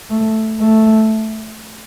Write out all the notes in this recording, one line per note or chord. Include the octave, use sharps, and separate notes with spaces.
A3
A3